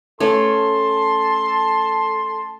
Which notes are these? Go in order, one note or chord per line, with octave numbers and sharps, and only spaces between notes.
A3 C#4 A4 A5 C6